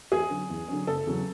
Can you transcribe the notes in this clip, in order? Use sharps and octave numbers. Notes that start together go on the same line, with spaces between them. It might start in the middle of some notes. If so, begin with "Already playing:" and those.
E2 G#4
D3 F#3 C#4
E2
D3 F#3 C#4
F#1 A4
E2 C#3 F#3